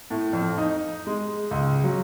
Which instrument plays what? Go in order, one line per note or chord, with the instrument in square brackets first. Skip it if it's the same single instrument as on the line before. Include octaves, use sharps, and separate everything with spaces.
[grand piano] A2
F2
D#4
G#3
C#2
F#3